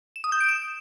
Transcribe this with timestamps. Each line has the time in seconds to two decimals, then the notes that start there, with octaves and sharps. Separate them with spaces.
0.16 E7
0.24 D#6
0.32 G6
0.40 D7
0.49 E7